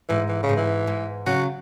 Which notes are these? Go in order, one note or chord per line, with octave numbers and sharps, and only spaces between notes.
G#2 E3
E3
C#3
G#2
E3
G#2
C#3 F#3 F#4